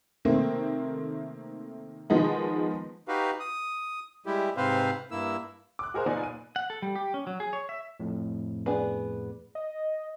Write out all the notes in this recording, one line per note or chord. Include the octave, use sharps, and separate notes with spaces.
C3 D#3 A3 A#3 C4
D#3 F3 G#3 B3 D#4
D#4 F#4 G4 B4 F5
D#6
G3 G#3 E4 G4
G#2 C3 C4 B4 C5 F5
G2 A#3 E4 E6
D6 F#6
F#4 G#4 A#4 C5
F#1 A#2 B3 D#4 D5 G#5
D#7
F#5
A4
G3
G4
C#4
F#3
G#4
C#5
E5
F2 A2
B3 D4 G#4
D#5